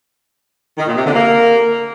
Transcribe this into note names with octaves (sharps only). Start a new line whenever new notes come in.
D#3
A#2
C3
D3
A#3